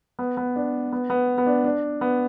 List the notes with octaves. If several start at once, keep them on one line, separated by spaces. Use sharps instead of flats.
B3
B3
D4
B3
B3
B3
D4
D4
B3